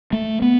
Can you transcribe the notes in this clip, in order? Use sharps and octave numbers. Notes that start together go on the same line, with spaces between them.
A3
B3